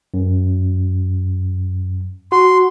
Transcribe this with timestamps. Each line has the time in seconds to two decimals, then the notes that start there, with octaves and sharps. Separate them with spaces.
0.14 F#2
2.32 F#4 C6